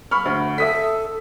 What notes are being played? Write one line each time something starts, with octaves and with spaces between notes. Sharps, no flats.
B5 C#6 F6
D2
A4 E5 D#6 B6